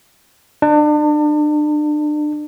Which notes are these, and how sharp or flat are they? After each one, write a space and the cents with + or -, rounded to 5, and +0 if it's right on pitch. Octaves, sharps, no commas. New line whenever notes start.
D4 +35